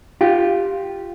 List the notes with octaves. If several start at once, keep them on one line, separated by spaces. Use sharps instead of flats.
F4 G4